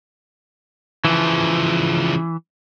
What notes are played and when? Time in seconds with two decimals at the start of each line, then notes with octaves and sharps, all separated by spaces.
1.05 C#3 E3 F3